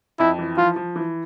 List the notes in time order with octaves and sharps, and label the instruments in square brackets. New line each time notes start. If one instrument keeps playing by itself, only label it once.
[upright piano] F2 [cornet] E4
[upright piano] E3
[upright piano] F3 [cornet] F4
[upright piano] F3
E3